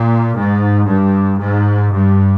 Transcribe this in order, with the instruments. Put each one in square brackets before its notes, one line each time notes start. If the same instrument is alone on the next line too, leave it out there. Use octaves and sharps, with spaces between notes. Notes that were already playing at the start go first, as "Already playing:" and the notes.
Already playing: [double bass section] A#2
G#2
G2
G#2
G2